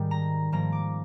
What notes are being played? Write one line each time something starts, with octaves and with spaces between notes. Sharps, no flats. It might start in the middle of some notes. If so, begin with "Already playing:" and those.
Already playing: G#2 D#3 G3
A#5
G#2 F3 A#3 A#5
D6